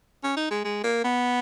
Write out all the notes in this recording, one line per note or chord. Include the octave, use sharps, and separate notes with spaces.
C#4
D#4
G#3
G#3
A#3
B3